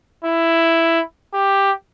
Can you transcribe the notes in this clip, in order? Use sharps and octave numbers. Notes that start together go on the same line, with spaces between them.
E4
G4